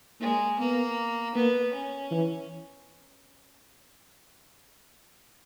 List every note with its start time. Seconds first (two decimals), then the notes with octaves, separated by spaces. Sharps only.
0.21 G#3 A#3
0.59 A#3 B3
1.35 A#3 B3
1.73 C#4
2.11 E3